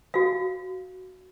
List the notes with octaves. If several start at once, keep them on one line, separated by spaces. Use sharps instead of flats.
F#4 F5